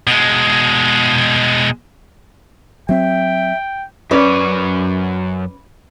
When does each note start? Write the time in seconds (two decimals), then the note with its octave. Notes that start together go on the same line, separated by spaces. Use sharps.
0.07 B2 G#3
2.89 F#3 C4 E5 G5
4.11 F#2 C#4 B4 C#5 D5